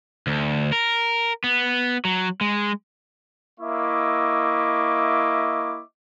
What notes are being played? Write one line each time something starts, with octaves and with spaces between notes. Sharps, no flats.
D2
A#4
B3
F#3
G#3
A#3 E4 D#5 E5 C#6 D6